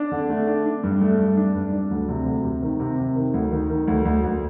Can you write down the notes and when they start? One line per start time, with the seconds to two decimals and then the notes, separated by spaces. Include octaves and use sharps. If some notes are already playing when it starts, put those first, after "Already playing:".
Already playing: D4
0.12 D3
0.29 A3
0.47 D4
0.66 D4
0.83 G2
1.01 A3
1.19 G2
1.37 D4
1.55 G2
1.73 D4
1.91 D2
2.09 C3
2.26 D2
2.44 C3
2.62 D#3
2.80 C3
2.98 C3
3.16 D#3
3.34 D2
3.52 D#3
3.70 D#3
3.87 D2
4.05 D2
4.23 D2